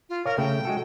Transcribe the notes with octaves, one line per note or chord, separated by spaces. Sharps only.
F4
A#4 C#5 F5
C#3 A3 G5
G#3 F#4 A4